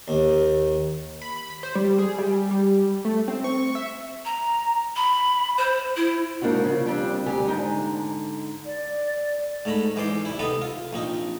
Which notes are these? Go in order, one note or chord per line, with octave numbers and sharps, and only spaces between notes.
D#2
B5
B5
C5
G3
G#4
G3
G3
A3
C4
C#6
E5
A#5
B5
C5
E4
G#2 A#3 D4 D#4 F#4
C#3 F3
F3 G3 C4 D4
D2 G3 G4 G#5
G#2 D3 D#4
D5
G#2 A3 A#5 B5
G#2 E3 C5 D5 C6
C3 E4
C3 B3 D#4 A4 B4
F4
A#1 C4 D#4